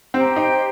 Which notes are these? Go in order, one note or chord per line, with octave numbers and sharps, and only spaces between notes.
C4 G4 C5 G5 A#5
D#4